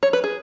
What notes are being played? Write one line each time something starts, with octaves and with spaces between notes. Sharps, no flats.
C#5
B4
G#4